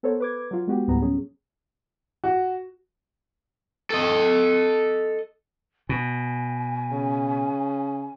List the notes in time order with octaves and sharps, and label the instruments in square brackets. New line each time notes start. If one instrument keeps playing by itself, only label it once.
[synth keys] B3 A4 A#4 C5 C#5
B4 D6 G#6
F#3 F4
G#3 B3 F#4 G4
D2 A2 G3 B3 G4 A#5
F#3 C#4 G#4
[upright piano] F#4
[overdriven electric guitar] A4 D#5
[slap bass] B2 [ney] G#5
[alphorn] C#3